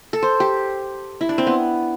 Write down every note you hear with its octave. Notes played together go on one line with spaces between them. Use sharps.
A4
C5
G4
E4
D4
C4
B3